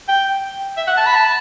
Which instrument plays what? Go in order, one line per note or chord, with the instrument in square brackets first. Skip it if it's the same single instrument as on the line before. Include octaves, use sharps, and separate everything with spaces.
[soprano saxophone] G5
E5
F#5
A5
B5
A5